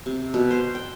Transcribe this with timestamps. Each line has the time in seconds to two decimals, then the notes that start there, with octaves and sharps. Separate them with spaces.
0.06 C3
0.34 B2
0.51 C5
0.75 G5